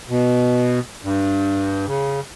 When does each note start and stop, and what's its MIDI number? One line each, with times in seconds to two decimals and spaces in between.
0.09 0.79 47
1.04 1.86 43
1.88 2.20 49